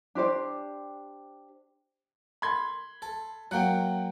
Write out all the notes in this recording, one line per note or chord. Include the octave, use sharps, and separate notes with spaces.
D4 G4 C5 D5
B5 C6 G#6
A4
F#3 A#3 F#5 G5